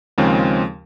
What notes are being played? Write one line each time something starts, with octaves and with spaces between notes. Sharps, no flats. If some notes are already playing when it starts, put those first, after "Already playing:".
D#2 C#3 F3 G#3 C4